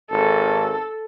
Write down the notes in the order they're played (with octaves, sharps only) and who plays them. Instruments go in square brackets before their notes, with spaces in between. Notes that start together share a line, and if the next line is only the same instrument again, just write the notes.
[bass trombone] G#1 [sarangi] A4